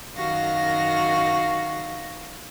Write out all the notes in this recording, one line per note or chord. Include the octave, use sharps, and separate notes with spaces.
F#2 D#3 F#4 F5 A#6